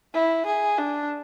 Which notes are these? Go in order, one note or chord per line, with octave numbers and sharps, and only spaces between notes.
E4
G#4
D4